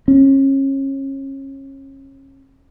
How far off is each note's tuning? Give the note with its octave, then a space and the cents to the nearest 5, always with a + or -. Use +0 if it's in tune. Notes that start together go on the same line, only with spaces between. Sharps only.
C#4 -30